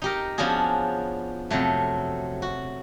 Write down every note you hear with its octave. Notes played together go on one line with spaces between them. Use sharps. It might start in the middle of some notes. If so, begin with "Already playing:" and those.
D#4 G4 A#4
F3 B3 C#4 D4 F#4 G#4
F2 C3 F#3 A3
F#4